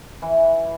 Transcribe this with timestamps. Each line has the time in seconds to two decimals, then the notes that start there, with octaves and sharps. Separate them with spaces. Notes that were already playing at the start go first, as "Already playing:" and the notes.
0.22 E3